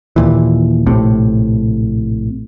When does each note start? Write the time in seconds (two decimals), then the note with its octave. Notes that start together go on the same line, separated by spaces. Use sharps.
0.16 D#2 A#2 E3
0.86 A#1 A2 C3